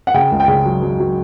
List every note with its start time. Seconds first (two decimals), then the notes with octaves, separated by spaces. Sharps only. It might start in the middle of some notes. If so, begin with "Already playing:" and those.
0.07 F#5
0.14 C#3 G5
0.32 C#2
0.40 G5
0.48 C#3
0.65 F#3
0.83 F#3
1.00 F#3